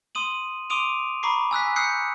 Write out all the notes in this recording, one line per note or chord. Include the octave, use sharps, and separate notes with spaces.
C6 D#6 D#7 F#7
C6 D6 D#6 D7 D#7 F7
A#5 B5 C#6 D6 C7
G#5 E6 F#6 B6
D#6 E6 F#6 G6 C7 C#7